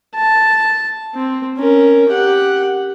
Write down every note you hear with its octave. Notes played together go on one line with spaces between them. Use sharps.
A5
C4
C#4 A#4
G4 F#5